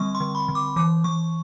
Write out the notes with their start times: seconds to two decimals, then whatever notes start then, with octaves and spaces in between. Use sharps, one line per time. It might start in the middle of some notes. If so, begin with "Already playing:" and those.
Already playing: D3 G3 C4 C#6
0.15 C6
0.20 D3
0.35 B5
0.48 D3
0.55 D6
0.76 E3 D6
1.04 E3 C#6